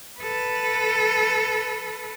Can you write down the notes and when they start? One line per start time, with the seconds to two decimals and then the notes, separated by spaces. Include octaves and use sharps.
0.20 A4 B4